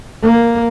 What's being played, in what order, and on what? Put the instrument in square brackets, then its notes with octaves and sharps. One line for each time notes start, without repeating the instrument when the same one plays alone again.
[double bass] A#3